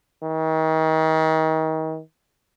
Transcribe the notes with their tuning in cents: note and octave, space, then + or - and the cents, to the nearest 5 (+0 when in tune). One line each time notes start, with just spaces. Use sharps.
D#3 +35